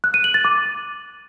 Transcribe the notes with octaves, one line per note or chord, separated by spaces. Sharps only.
F#6
D#7
F#7
A6
D6